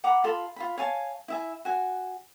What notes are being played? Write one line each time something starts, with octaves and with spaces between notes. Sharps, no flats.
F#5 A#5 B5 D6
F4 A4 B5 C6
F4 B5
C#5 F5 G#5 A5
E4 E5 G#5
F#4 G#5